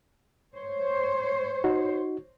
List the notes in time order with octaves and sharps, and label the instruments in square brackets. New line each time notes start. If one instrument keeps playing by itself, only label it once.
[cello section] C5 C#5
[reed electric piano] D#4 F#4